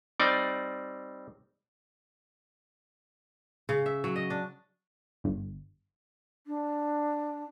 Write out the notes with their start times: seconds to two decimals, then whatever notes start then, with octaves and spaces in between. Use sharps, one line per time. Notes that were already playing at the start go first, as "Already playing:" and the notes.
0.20 G3 C4 D#4 D5
3.69 C#3
3.86 E5
4.04 F#3
4.16 D#5
4.30 D4
5.24 G1
6.47 D4